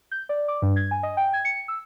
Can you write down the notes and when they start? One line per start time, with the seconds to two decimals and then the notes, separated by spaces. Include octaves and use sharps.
0.11 G6
0.29 D5
0.48 D6
0.62 G2
0.76 G#6
0.91 G#5
1.03 D#5
1.17 G5
1.33 G#6
1.45 C#7
1.68 E6